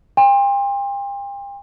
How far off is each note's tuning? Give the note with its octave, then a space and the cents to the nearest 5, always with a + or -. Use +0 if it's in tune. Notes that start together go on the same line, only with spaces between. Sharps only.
G5 +40 C6 +20